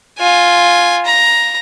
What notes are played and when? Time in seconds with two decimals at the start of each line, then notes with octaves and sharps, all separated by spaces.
0.19 F4 G#5
1.06 A#5